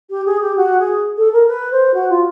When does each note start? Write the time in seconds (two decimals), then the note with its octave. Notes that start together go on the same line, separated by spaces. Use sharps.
0.10 G4
0.26 G#4
0.41 G4
0.57 F#4
0.79 G#4
1.18 A4
1.33 A#4
1.48 B4
1.71 C5
1.94 F#4
2.10 F4